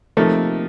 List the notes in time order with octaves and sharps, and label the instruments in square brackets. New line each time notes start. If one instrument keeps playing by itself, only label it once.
[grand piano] C3 F3 A#3 D#4 [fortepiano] A3